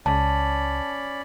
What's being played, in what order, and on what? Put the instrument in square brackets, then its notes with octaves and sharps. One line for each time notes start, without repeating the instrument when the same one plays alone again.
[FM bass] C#2 [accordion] C#4 D5 B5 [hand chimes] A5